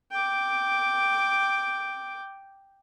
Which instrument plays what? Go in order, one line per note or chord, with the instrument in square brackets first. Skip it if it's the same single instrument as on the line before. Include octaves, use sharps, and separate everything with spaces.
[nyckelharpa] G5 D6